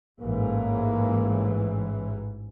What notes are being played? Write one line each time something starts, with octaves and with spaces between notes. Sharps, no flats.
A1 G#2 E3 A#3